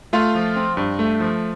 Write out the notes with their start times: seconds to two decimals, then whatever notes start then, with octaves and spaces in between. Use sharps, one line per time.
0.13 A3 F4 F5
0.35 F3
0.56 C4
0.77 G2
0.99 A3
1.20 F3